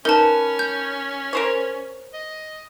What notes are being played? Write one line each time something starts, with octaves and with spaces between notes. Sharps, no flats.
C#4 D#4 A#4 B4 A5
G6
A#4 C5 C#5
D#5